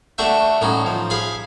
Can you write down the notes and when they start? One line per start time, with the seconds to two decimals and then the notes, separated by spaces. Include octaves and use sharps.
0.18 A3 D4 F#4 E5 G5
0.61 A2 C#4 D#4 F#4
0.86 F3
1.10 G#4 F5 G#5 B5